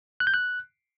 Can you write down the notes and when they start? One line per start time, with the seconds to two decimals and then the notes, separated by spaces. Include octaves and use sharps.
0.20 F#6
0.27 G6
0.34 F#6